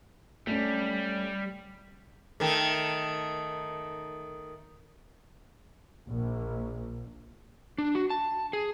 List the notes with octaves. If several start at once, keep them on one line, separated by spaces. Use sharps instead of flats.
G3 A3 C#4
D#3 A3
A#1
D4
F#4
A5
G#4